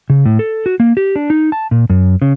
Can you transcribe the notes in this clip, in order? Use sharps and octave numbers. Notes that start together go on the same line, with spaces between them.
C#3
A2
A4
F#4
A#3
G4
D4
D#4
A5
A#2
F#2
C#3